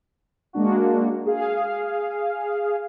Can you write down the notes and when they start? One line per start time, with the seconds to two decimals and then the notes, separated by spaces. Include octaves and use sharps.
0.53 G#3 A#3 D4 F#4
1.26 G#4 F5